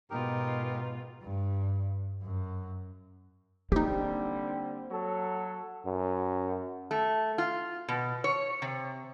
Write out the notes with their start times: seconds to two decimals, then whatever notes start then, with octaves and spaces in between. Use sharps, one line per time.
0.10 G#2 B2 D#4 F4 G4 A#4
1.22 G2
2.22 F#2
3.72 D3 G3 A#3 C4 D#4 G4
4.91 F#3 A4
5.85 F#2
6.91 A3
7.38 F4
7.88 B2
8.24 C#5
8.62 C3